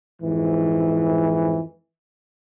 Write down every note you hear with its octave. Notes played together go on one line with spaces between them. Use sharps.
F2 G#2 E3